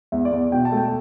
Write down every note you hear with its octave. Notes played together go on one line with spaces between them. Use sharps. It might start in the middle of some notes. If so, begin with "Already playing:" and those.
E2 E5
D5
E2
B2 G5
A5
A3
G5